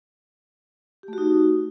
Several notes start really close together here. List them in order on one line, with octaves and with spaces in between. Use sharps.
G4 A3 F#4 D#4